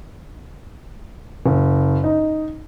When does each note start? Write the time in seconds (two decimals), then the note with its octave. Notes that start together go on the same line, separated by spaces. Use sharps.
1.46 F#1
2.04 D#4